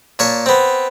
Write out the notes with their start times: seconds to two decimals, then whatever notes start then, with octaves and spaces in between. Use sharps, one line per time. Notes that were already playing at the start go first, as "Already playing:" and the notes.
0.19 A#2 C#5 A5
0.46 B3 C4